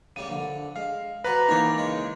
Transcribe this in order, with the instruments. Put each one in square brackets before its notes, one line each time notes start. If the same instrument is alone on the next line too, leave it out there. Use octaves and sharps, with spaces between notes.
[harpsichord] C#3 G3 A#3 [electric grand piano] D#7
[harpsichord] A#1 D3
[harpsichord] G#3 [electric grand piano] F5
[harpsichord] F#4 C5 D5 [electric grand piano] B4 [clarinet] A#5
[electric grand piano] E3 A#3 D#4 [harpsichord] C#5 D5 F5
[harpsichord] C#3 C#5 [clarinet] G#3